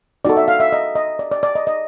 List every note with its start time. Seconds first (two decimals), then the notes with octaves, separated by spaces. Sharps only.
0.25 D#4 F#4 A4 D5
0.37 E5
0.48 F5
0.60 E5
0.72 D#5
0.95 D#5
1.19 D5
1.31 D5
1.43 D5
1.55 D#5
1.67 D#5